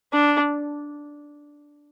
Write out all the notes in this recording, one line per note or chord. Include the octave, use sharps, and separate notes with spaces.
D4